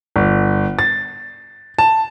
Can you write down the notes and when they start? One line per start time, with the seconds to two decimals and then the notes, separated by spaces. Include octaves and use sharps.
0.16 G1
0.79 A6
1.79 A5